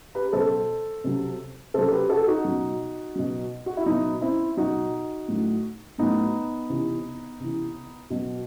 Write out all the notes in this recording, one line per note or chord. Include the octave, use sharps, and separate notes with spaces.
G4 B4
B4
B2 F#3 A4 C5
C3 F#3
C3 F#3 A4 C5
G4 B4
F#4 A4
D#4 F#4
B2 F#3
B2 F#3
F#4
E4
B2 F#3 B3 D#4
C4 E4
B2 F#3 D#4 F#4
A2 F#3
A2 F#3 B3 D#4
C3 E3
C3 E3
B2 F#3